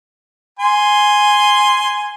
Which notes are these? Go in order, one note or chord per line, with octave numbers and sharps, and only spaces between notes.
G#5 C6